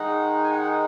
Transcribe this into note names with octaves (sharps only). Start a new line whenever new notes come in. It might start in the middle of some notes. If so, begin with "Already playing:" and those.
Already playing: D#3 G#3 D#4 F#5
G#5
F#5